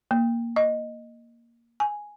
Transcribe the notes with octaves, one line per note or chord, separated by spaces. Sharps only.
A#3
D#5
G#5